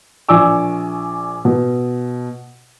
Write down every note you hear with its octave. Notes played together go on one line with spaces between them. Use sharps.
A#1 D5 G#5 C#6 D6 E6
B2